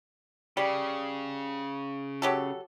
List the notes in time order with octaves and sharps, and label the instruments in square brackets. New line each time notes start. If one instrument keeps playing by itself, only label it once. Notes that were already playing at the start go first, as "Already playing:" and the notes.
[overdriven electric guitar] C#3 [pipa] G3
[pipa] F#3 G4 A4